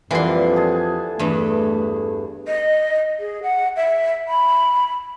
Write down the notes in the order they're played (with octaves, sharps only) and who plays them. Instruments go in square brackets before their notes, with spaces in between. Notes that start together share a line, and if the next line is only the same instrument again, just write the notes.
[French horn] F2 [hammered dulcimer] A#2 D3 G3 [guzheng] E3 C6
[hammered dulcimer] G#4 A5
[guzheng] E2 G2 [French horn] A3
[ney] D#5
G#4
F#5
E5
B5